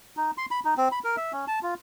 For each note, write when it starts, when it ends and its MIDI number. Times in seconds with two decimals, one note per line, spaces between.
0.17 0.31 63
0.38 0.46 84
0.51 0.60 83
0.65 0.74 63
0.77 0.88 60
0.92 0.99 83
1.04 1.16 70
1.17 1.32 76
1.33 1.45 61
1.48 1.59 81
1.63 1.74 65